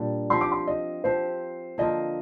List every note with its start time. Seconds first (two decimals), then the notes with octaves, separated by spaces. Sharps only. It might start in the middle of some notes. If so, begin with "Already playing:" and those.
Already playing: A#2 G3 D4
0.30 F3 C4 G4 C6
0.41 D6
0.52 C6
0.67 D#5
1.04 F3 C4 G4 C5
1.78 D3 F3 A#3 F4 D#5